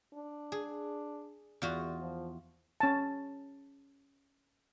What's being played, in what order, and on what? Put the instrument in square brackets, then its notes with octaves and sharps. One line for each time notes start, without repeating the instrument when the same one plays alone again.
[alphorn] D4
[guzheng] G#4
E2 F4 F#4
[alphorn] F3
[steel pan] C#4 A5